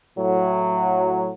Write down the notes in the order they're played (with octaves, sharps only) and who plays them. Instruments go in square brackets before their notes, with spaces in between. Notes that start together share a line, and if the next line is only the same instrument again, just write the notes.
[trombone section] A2 F#3